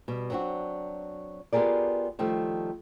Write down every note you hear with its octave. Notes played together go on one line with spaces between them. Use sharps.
B2 G3
F#3 B3 C4 D4 F#4
B3 F4 G4 G#4 A#4 D5
D#3 F3 G3 A3